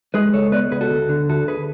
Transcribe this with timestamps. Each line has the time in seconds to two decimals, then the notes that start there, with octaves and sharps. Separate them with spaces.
0.14 G#3 G#4 B4
0.33 C#2 A4 C#5
0.52 B3 B4 D5
0.71 C#2 G#4 B4
0.81 F#4 A4
0.90 D2
1.09 D3
1.29 D2 F#4 A4
1.47 D2 G#4 B4